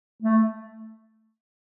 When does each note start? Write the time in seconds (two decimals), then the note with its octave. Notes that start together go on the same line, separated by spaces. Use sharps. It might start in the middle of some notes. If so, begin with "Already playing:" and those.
0.22 A3